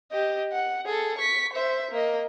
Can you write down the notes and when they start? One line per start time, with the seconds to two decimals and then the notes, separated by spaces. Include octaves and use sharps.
0.12 G4 D#5
0.52 F#5
0.86 G#4 A4
1.18 C#6 B6
1.53 C5 E5
1.91 A#3 D#5